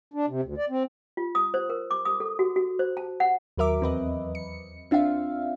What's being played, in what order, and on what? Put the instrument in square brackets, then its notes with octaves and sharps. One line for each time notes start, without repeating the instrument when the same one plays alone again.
[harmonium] D4
C3
D2
D5
C4
[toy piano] F4
D#6
C5
A#4
D6
D#6
A4
F#4
F#4
C5
A5
F#5
[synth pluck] D#2 F#3 A#4 E5 D6
E2 C4 B4 D#5
C#7
C4 D4 F4 E5 F5